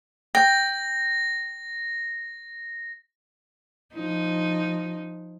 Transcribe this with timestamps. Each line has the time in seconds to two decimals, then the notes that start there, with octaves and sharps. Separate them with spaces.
0.35 G5 A#6
3.94 F3 D#4